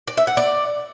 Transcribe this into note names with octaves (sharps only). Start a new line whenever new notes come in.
D5
E5
F#5
D5